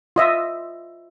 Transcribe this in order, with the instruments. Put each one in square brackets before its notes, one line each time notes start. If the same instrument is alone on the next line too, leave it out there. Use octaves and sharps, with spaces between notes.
[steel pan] F4 D#5 E5